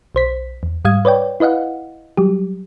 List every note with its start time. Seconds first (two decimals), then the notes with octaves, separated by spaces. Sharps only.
0.15 B1 C5 B6
0.63 E2
0.85 G#2 G3 F5 D#6 G#6
1.05 B4 C#5 D5 G5
1.40 E4 B4 D#5 F5 F#5
2.17 F#3 G3 G4